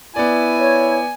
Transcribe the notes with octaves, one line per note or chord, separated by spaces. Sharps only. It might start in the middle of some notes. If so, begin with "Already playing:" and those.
B3 E4 D5 G#5
C#5